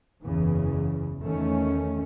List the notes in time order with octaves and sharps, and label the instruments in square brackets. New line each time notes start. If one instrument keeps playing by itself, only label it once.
[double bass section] F#1 E2 C#3 E3
E2 D#3 A3 C#4